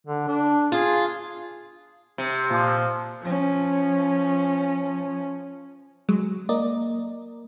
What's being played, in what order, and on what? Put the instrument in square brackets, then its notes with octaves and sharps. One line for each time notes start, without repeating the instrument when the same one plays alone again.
[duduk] D3
D4
[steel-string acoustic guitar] F4 [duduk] G#4
[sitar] C3
[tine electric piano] A#2 [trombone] F3
[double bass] F3 C#4
[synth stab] F#3 G#3
[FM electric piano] A#3 [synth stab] D5 D#5